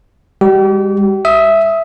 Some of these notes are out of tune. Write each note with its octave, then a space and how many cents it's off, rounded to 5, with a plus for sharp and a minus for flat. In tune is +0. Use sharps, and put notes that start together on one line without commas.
G3 +45 G4 -40
E5 +0 D#6 +20